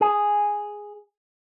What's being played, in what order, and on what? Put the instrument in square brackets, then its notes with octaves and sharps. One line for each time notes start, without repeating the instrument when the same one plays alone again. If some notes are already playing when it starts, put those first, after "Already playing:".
[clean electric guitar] G#4